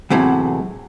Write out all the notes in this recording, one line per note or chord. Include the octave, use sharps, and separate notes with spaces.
E2 A2 C3 E3 F#3